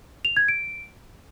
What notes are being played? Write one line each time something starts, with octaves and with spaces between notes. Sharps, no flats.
F7
G#6
D7